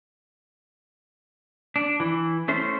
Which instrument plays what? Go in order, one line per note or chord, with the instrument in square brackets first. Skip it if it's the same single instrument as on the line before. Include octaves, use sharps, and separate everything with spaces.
[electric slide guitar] D4
E3
A3 C#4 C5